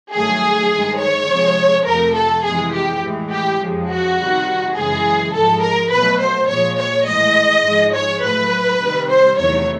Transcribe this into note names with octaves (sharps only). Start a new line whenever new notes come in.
G2 D#3 F#3 A3 G#4
G2 D#3 G#3
C#5
C3 F3 G#3
F2 C3 F3 A3 A#4
A4
F2 C3 E3 G#3 G#4
G4
A2 E3 G#3
G4
F2 C#3 F3 G#3
F#4
C3 D#3 G3
F#2 C#3 E3 G#3 G#4
G#2 F3 G#3 A4
A#4
B2 F#3 A3 B4
C5
A#2 F3 G#3 C#5
C#5
A2 E3 G#3 D#5
G#2 F3 G#3
C#5
A2 F#3 A3 B4
C3 D#3 G3
C5
E2 C3 D#3 F#3 A3 C#5